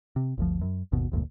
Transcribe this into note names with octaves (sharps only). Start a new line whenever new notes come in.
C3
G1 D2 F3
F#2
G#1 D#2 B2
F1 D2 G2 A#2